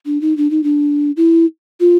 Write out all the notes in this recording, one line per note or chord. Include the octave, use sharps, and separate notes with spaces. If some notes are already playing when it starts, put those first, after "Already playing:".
D4
D#4
D4
D#4
D4
E4
F4